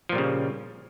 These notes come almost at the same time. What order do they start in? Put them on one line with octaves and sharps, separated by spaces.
F3 A#2 G3 C#3